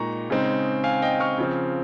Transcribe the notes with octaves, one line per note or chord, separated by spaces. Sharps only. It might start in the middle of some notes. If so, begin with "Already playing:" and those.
Already playing: A#2 G#3 D#4 A#5 C#6
C#3 G#3 C4 D#4
F5 G#5
D#5 G5
C#6 F6
C#3 F3 C4